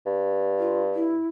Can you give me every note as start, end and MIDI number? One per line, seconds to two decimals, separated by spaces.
0.06 1.21 43
0.59 0.81 65
0.95 1.27 64